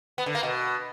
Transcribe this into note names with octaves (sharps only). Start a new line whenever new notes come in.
B3
D3
A#3
B2